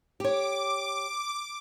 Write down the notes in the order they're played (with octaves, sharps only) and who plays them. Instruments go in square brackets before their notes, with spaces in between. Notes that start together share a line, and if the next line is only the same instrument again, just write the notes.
[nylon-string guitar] G4 C#5 [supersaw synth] D6